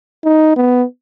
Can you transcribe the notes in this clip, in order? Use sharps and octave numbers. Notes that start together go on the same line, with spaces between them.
D#4
B3